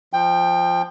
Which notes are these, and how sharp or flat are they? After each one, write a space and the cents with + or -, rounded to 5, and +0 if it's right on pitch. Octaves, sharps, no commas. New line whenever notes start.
F3 +0 G5 +15